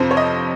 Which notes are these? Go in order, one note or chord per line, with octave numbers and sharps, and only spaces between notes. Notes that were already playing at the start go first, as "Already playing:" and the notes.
Already playing: F2 C3 F3 C5
C#5
D#5